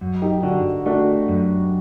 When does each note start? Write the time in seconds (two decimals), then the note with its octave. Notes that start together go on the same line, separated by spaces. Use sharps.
0.01 F#2
0.22 D#4 G4
0.43 D3 D4 F#4
0.86 A3 D4 F#4
1.28 F#2